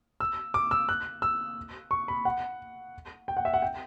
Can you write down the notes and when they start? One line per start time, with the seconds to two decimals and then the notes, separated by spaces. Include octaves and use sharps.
0.20 E6
0.54 D6
0.71 E6
0.89 F#6
1.22 E6
1.91 C#6
2.08 B5
2.25 F#5
3.28 G5
3.37 F#5
3.45 E5
3.54 F#5
3.62 G5